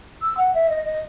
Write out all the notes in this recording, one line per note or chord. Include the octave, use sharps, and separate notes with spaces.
E6
F#5
E5
D#5
D#5